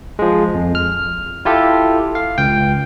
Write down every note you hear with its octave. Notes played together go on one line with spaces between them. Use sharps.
F3 G#3
F2
F6
E4 F4 G4 A4
F5
C#2 G5